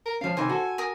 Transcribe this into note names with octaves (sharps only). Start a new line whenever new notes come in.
A#4
F3 C#4 F5
C3 D#3 E3 C5 G#5
F#4 A4
A#4 G#5 D#6